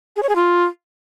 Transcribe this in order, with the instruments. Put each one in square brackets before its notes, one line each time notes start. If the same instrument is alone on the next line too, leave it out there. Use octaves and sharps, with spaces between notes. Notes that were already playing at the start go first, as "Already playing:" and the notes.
[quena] G#4
C#5
G#4
F4